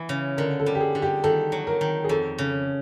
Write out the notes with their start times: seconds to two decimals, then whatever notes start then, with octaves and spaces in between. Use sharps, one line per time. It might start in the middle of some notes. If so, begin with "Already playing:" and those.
Already playing: E3 B3
0.09 C#3
0.37 D3 A#4
0.60 A4
0.66 G3
0.75 G4
0.80 G#4
0.95 D3
1.02 G4
1.24 D#3 A4
1.52 F#3
1.67 A#4
1.81 D#3
2.04 G#4
2.09 F2 A4
2.38 C#3